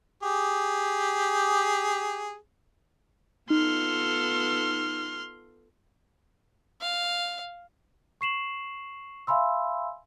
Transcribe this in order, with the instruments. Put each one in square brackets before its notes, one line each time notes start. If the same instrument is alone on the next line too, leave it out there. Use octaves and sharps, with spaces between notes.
[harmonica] G4 G#4
[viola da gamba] B3 F4 A4 [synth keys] D#4 [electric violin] C6 F6
[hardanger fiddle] F5
[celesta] C#6 C7 E7 F#7
E5 F5 G#5 B5 C6 E6